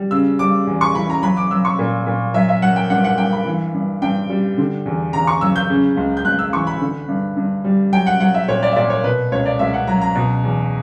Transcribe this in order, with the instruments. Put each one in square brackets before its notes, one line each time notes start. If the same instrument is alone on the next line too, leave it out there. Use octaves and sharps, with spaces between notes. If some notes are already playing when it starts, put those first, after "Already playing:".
Already playing: [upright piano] G3
C#3 E6
G3 D6
E2
C#6
E3 B5
A#5
F#3 B5
D6
F#3 E6
C#6
A#2
A#2
F#3 E5
E5
F#3 F#5
G5
G2 F#5
F#5
G2 G5
B5
E3
G2
G2 G5
G3
D3
E2
E2 A#5
C#6
F#3 E6
G6
C#3
C#2
G6
C#2 F#6
E6
E3 C#6
B5
D3
G2
G2
G3
F#3 G5
F#5
F#3 F#5
E5
A#2 C#5
D5
E5
A#2 D5
C#5
B2 B4
C#2 C#5
D5
C#2 E5
F#5
F#3 A#5
A#5
B2
E2